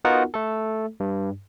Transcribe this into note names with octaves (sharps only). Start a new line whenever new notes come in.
B3 D#4 F4 F#4 A#4 F#5
A3 A4
G2